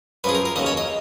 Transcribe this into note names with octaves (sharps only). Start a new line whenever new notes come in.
F#2 F3 G#4 B4
A#4
A#4
D#2 C#3 F#3 D#5
C#5
D#5